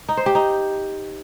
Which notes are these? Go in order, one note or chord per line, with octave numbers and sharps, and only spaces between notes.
D#4
C5
G4
D#4